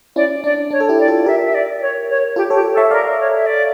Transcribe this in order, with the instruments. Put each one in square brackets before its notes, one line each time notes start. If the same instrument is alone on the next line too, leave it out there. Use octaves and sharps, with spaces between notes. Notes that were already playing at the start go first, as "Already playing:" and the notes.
[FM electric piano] C#4 E4 [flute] D5
[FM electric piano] D4 [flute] D5
[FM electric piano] D4 [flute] C#5
[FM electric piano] A4
E4 G4
[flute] D5
[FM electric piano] F4 A4
[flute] D5
[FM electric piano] G4 A#4 [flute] E5
[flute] E5
D5
C#5
C#5
[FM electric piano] F4 A4 [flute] G4
[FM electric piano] A4 C#5
[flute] G4
A4
[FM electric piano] C#5 E5
[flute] A#4 [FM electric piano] D5 F5
[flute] C#5
E5
D5